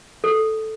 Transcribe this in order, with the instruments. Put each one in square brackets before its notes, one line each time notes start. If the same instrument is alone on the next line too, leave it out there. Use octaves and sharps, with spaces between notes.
[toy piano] A4